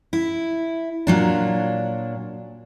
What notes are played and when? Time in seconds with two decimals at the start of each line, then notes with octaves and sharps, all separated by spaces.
0.13 E4
1.07 A#2 F#3 D4